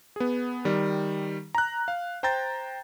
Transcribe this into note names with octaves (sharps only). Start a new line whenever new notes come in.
B3 G#4
D#3 G3
A#5 F#6
F5
C5 G5 A#5 G6 A6